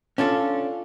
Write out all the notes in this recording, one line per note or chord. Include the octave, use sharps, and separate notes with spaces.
C#4 D4 F4 A4